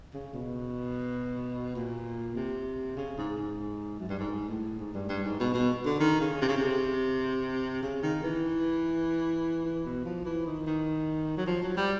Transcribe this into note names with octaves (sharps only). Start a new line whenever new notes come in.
C#3
B2
A#2
C3
C#3
G#2
G#2
F#2
G2
G#2
A2
G#2
G2
G2
G#2
B2
B2
D3
D#3
C#3
C3
C#3
C3
C#3
D#3
E3
E3
B2
F3
E3
D#3
D#3
F#3
F3
F#3
G3